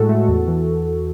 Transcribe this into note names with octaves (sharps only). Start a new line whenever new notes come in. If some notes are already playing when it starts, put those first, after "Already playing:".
Already playing: A2 G#3 F#4 A4
A3
E2
E3